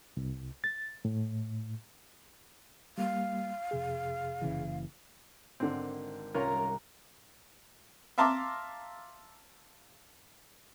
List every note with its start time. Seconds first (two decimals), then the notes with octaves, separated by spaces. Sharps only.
0.17 C2
0.64 A6
1.05 A2
2.98 G3 A#3 F5
3.71 F2 C3 G#4
4.42 F#1 C#3 E3
5.60 G#1 D3 C4
6.34 C2 C#4 F4 A#4 A#5
8.18 E5 F5 A5 A#5 C6 D6